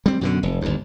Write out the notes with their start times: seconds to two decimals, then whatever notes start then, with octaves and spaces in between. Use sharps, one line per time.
0.06 G3 C4
0.21 F#2 B2 D3
0.43 F1
0.61 G1 D#2